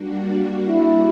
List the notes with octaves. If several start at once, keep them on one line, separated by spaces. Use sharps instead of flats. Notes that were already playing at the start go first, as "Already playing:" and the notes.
Already playing: G3 A#3 D4 F#4
E4